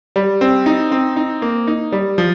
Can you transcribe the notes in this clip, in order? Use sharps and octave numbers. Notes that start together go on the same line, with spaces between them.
G3
C4
D#4
C4
D#4
A#3
D#4
G3
F3